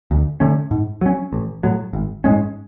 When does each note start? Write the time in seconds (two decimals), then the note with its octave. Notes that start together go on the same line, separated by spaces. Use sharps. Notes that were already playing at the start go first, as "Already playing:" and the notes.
0.11 D2
0.40 D3 A3 C#4
0.71 G#2
1.01 F#3 C#4
1.33 A1
1.63 A2 F#3
1.93 G#1
2.24 G#2 G#3 C#4